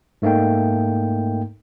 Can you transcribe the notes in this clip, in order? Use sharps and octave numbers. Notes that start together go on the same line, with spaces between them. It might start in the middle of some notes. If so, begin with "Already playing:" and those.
G#2 A3 A#3 D#4 G5